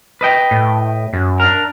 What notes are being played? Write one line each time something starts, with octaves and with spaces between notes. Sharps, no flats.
B4 D#5 G5
A2
F#2
D4 A#4